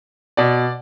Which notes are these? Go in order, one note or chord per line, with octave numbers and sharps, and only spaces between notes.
B2 D5